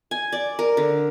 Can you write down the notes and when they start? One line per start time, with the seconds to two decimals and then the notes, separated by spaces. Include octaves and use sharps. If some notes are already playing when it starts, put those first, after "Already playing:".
0.11 G#5
0.32 D5
0.59 A#4
0.77 D3